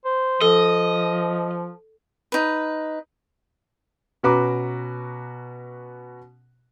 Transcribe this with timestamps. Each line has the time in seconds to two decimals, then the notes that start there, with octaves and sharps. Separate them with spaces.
0.05 C5
0.42 F3 A4 D#5
2.32 D#4 B4
4.23 B2 C#4 F#4 B4 A#5 D6